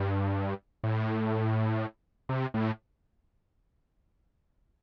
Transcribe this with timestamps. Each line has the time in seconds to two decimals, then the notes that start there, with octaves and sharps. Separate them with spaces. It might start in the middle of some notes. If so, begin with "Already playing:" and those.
Already playing: G2
0.84 A2
2.29 C3
2.54 A2